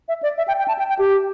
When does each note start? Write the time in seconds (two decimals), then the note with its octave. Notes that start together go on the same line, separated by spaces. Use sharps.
0.08 E5
0.23 D5
0.38 E5
0.48 G5
0.59 G5
0.68 A5
0.79 G5
0.89 G5
0.99 G4